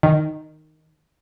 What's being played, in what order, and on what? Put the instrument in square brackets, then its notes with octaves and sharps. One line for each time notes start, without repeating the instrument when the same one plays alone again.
[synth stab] D#3